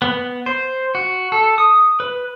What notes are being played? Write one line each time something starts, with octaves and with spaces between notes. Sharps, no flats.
B3
C5
F#4
A4
D#6
B4